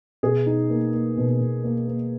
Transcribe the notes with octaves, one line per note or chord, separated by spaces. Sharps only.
B2 G#4
D#4
A#3
A#3
B2
B2
A#3
A#3